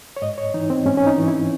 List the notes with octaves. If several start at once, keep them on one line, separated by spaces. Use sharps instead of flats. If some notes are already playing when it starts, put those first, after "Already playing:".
C#5
G#2 D#5
C#5
E3 D#4
C4
G#2 C#4
C#4
D#4
E3
E4